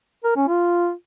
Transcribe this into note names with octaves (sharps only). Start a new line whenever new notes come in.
A#4
C#4
F4